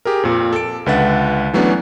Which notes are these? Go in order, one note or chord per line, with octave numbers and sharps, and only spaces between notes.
G4 G#4 A#4
F2 A#2
A4 D7
C#2 D3 B4 E5 F#5 A6
E3 F#3 A3 B3 C#4 D4